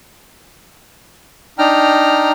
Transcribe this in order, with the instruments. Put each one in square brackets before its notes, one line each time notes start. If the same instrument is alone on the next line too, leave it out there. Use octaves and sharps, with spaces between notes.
[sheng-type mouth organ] D4 D#4 G5 A#5 F6